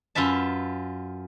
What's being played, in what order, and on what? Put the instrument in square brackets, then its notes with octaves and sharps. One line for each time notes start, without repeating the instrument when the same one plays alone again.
[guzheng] F#2 F4 B4 E5 A5